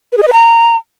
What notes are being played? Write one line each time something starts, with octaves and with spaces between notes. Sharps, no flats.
B4
G#4
D#5
B4
A#5